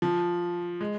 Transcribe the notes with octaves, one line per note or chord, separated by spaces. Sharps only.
F3
G#3